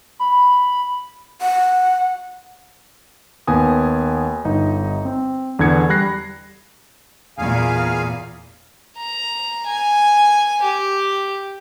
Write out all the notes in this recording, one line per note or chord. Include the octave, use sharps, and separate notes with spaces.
B5
F#5
D#2 B3 G#5 D#6
G1 D#4
C4
E2 D3 B3 G#6 C#7
G3 B5 F#6 A#6 C7
E2 A#2 G#4 F5 G#5
A#5
G#5
G4